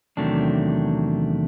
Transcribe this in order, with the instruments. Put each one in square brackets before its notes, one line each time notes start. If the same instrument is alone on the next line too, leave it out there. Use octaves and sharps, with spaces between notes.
[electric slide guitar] E2 C3 D#3 F#3 A3 D4